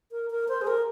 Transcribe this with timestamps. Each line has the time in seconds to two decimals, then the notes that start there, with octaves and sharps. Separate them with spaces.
0.12 A#4
0.31 A#4
0.48 C5
0.61 G#4
0.67 A#4